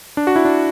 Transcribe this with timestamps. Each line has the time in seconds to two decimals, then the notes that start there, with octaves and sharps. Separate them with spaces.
0.17 D4
0.27 F#4
0.36 E4
0.45 D4